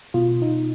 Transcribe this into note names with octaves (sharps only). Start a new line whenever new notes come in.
B2 F4
B2 D#4